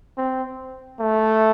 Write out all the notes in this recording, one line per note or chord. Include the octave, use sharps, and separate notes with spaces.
C4
A3